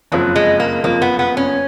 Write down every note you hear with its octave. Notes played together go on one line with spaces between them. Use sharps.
F#1 F2 F3 F#3
G#3
A#3
F#1 F2 F3 A#3
B3
B3
C#4